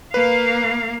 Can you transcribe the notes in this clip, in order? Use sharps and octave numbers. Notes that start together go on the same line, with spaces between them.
A#3 B4 F5